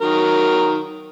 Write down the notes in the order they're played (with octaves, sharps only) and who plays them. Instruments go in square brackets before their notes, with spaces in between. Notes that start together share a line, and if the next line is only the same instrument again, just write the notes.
[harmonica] D#3 F#3 A#4